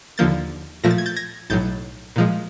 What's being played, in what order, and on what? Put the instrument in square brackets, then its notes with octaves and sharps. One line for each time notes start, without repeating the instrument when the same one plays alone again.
[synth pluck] D#2 D3 F3 A#3 G6 A6
A#2 F3 A3 A#6
A6
G#6
G6 A6
G#6 A#6
B1 A2 F#3 G6 A6
A#2 F3 G#3